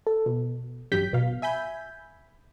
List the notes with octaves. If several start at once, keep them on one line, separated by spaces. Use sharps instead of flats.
A4
B2
A1 G2 F#3 G4 G6 B6
G#1 B2 F5
E5 G#5 B5 G6